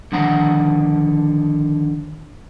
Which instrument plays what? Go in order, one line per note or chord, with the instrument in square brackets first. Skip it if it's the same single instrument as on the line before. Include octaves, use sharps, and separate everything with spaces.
[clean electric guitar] D3 D#3 F3 F#5 A#5 B5